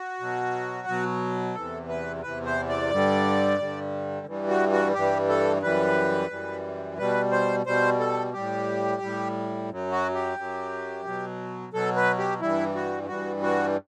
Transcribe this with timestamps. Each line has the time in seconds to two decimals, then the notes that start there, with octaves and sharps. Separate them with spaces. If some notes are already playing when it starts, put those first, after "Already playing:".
Already playing: F#4
0.20 B2 F#3
0.88 B2 F#3
1.55 E2 C3 E3 A4
1.89 B4
2.23 E2 C3 E3 B4
2.45 C5
2.69 D5
2.91 G2 D3 G3
3.59 G2 D3 G3
4.27 G2 E3 G3
4.49 F#4
4.72 F#4
4.94 G2 E3 G3 G4
5.29 A4
5.62 F#2 E3 G3 B4
6.30 F#2 E3 G3
6.98 B2 G3 B4
7.32 C5
7.66 B2 G3 C5
7.99 A4
8.33 A2 G3 G4
9.02 A2 G3
9.70 F#2 F#3
9.92 F#4
10.15 G4
10.38 F#2 F#3
11.05 B2 F#3
11.73 B2 F#3 A4
11.96 B4
12.18 G4
12.41 G2 E3 G3 E4
12.75 F#4
13.08 G2 E3 G3 F#4
13.43 F#4